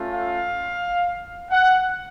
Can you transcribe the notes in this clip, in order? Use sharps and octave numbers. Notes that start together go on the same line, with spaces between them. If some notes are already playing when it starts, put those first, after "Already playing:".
Already playing: A3 C#4 F4
F5
F#5